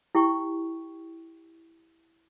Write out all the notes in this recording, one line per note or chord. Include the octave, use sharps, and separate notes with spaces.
E4 G4 G5 C#6